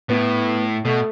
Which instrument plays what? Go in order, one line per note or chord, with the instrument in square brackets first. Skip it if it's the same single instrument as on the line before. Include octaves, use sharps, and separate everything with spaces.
[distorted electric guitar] A2 [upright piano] B3
[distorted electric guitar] B2 [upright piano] A3